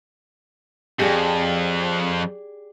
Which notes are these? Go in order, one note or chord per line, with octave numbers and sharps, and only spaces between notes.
F2 G4 G#4 D5